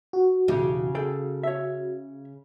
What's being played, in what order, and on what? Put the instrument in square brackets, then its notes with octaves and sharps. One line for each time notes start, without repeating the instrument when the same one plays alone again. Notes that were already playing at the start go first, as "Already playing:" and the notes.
[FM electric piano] F#4
[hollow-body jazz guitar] B1 E2 G4 [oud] C#3
[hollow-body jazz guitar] G#4 A4 G5
C#5 E5